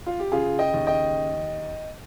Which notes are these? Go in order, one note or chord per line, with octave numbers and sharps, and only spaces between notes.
F4
G4
C#3 F4 G#4
D#5 G5
D#2
D#5 G5